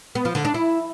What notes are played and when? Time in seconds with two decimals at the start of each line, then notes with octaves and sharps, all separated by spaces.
0.15 B3
0.25 F3
0.35 D3
0.45 D4
0.54 E4